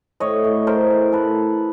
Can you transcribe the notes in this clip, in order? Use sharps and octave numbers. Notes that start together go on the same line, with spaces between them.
A2 C#5 D#5
A2
A2 A#4 C5
E3
A2 A4 B4